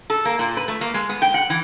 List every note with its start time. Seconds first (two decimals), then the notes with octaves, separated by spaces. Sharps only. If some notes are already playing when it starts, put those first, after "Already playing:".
0.10 A4
0.25 A#3
0.39 A#2
0.57 B4
0.68 A3
0.81 A#3
0.94 G#3
1.09 B3
1.22 G5
1.34 F#5
1.50 E3